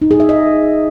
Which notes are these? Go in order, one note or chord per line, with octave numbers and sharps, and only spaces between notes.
D#4
G#4
E5
D#5